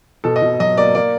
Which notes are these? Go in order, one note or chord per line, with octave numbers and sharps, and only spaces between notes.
B2 A4
D#5
B2
F#3 D#5
A#3 D5
A#3 D5